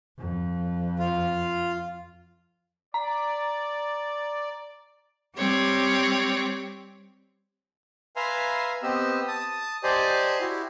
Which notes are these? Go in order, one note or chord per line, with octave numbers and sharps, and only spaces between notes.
F2
F4
D5 A#5
G3 C4 C#5 D6
B4 E5 F5 G#5 A#5 C6
B3 C4 G4 D#5 E6
A5 D#6
G4 C5 D5 D#5 G#5 A5
E4 F#4 G4